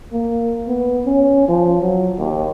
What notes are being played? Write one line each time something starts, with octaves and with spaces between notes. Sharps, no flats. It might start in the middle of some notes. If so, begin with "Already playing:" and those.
A#3
B3
C#4
F3
F#3
D#2